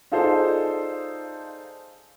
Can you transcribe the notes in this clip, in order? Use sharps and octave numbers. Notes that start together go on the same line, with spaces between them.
D#4 F4 G#4 A4 C5 D5